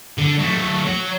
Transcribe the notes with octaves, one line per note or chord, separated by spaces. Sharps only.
D3
F#3 A3
F#3